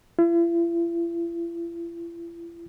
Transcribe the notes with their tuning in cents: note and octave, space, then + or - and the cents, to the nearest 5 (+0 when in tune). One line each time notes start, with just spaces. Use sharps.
E4 +45